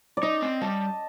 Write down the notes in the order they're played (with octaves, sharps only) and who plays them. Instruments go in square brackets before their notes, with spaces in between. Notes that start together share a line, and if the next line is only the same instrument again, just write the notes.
[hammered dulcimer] D5
[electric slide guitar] D#4 [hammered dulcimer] D#5
[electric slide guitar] C4
[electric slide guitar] G3 [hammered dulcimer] A5